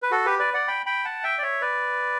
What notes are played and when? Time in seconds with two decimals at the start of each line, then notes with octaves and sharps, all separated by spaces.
0.03 B4
0.11 F#4 A4
0.26 G4 B4
0.39 B4 D5
0.54 D5 F#5
0.68 G5 B5
0.86 G5 B5
1.05 F#5 A5
1.24 E5 G5
1.38 D5
1.42 C#5 E5
1.61 B4 D5